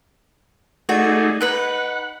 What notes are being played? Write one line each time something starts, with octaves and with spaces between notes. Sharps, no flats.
A3 D#4 F#4 G#4 D5 E5
D#4 B4 F#5 B5